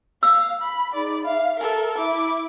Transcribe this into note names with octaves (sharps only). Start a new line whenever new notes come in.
F5 E6
B5
D#4 G#4 D5 B5
E5 F5
A4 A#4
E4 E5 D6